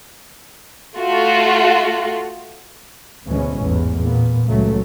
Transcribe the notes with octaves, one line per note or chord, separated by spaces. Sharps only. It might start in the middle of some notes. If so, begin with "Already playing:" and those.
A3 F4 F#4
D2 G#2 B2 E3 G#3 C#4
A1 E2 G#2
A#2 B3
C#2 F#3 A3